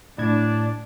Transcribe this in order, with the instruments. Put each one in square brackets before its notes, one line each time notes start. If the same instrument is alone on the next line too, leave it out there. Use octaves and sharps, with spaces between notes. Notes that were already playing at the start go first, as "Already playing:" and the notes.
[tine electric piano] A2 G#6 [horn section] D4